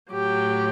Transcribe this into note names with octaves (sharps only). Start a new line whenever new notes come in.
A2 F#3 G4